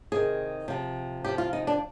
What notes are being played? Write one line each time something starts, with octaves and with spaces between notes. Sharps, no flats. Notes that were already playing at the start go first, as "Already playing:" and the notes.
C3 D#3 G#4
C3 F3
C3 F3 G4
F4
D#4
D4